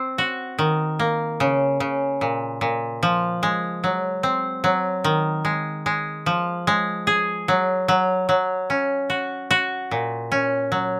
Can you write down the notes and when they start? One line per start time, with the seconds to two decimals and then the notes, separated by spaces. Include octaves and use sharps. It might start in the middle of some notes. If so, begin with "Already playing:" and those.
Already playing: C4
0.18 F#4
0.59 D#3
0.99 A#3
1.40 C#3
1.80 C#3
2.21 A#2
2.61 A#2
3.03 F3
3.43 G#3
3.84 F#3
4.23 C4
4.64 F#3
5.04 D#3
5.45 G#3
5.86 G#3
6.26 F3
6.67 G#3
7.07 G#4
7.48 F#3
7.88 F#3
8.29 F#3
8.70 C#4
9.10 F#4
9.51 F#4
9.91 A#2
10.32 C#4
10.72 F#3